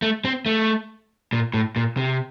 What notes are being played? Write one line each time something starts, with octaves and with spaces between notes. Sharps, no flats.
A3
C4
A3
A#2
A2
A#2
C3